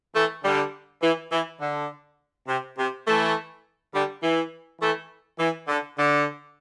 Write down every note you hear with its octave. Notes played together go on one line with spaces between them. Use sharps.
E3 A3
D3 G3
E3
E3
D3
C3
C3
E3 A3
D3 G3
E3
E3 A3
E3
D3
D3